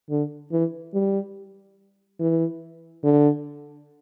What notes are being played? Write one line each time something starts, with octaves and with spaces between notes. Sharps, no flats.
D3
E3
G3
E3
D3